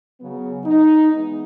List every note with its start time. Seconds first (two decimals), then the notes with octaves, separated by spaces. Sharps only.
0.20 C#3 F#3 B3
0.65 D#4
1.12 E3 G#3 B3 D#4